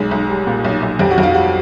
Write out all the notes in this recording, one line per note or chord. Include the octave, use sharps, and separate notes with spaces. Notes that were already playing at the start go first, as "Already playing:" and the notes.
Already playing: B1 G#3
B1
G3
A#2
B1
B1
F2 G4
F#4
F2
F4
G3 F#4